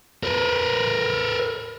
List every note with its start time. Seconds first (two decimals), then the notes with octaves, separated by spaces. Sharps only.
0.23 A#4 B4